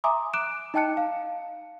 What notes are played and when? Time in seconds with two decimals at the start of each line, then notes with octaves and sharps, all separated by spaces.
0.04 E5 G#5 A#5 C6 D6 D#6
0.33 D6 F#6 D7 E7
0.74 D#4 D#5 G5 A5 F#6 C#7
0.97 F5